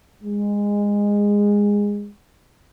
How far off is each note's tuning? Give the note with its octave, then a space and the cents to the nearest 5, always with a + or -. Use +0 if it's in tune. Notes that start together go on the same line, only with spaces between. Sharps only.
G#3 -20